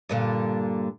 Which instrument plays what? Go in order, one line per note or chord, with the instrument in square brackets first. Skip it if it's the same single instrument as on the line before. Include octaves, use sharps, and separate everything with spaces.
[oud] G2 A#2 D3